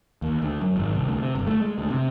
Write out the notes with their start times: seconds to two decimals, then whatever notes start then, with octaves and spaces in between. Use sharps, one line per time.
0.22 D#2
0.42 D2
0.61 F#2
0.77 G#1
0.95 C2
1.08 D2
1.22 C3
1.35 G1
1.47 A3
1.62 G#3
1.78 D2
1.90 C3